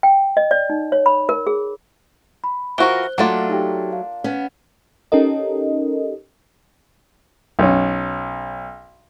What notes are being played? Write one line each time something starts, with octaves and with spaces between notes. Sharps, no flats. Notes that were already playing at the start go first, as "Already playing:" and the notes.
G5
D#5
D5
D#4
C#5
B5
A#4
G#4
B5
E3 F4 F#4 A#4 C5 F#6 G7
F#3 A3 A#3 D4 F4 F#5
D#4 G4 G5
F5
B3 C#4
C#4 D#4 G4 A4 A#4 D#5
B1 C#4